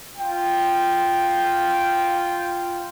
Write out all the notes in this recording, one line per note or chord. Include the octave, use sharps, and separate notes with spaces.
F4 G5